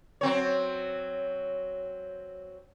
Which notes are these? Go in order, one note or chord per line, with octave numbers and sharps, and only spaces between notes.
F#3 C4 C#5